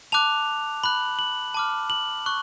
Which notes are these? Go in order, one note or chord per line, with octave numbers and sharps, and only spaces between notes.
A5 D6 F#6 F7
B5 F#6 F#7
F#7
A5 D6 F6
F#7
C#6 F#6